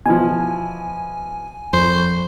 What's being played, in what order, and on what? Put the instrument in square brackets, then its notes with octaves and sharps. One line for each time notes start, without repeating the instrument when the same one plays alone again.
[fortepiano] B2 E3 F3 [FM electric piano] G#5
[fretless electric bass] F2 [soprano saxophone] C5